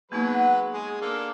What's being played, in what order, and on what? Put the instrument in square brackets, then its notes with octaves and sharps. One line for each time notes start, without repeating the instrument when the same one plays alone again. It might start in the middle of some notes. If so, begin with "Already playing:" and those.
[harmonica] F#3 G#3 B4 [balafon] A#3 B3 D#4
[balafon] F#5
[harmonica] G#3 G#4 G#5
A#3 D4 A4